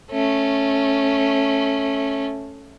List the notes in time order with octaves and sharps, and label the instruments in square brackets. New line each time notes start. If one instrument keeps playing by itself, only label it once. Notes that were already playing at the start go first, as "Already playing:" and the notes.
[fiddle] A3 C#4